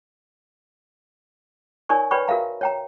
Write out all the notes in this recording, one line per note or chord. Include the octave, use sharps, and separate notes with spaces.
D#4 A#4 C#5 D5 G#5 C#6
B4 C#5 D5 G5 B5 C#6
F#4 A#4 E5 F5 A#5
C#5 G5 A#5